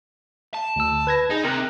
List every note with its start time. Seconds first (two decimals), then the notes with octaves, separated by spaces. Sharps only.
0.54 A5
0.76 D2 E6
1.07 B4 G#6 A#6
1.31 D#4 G#4
1.45 C3 A#4 F#6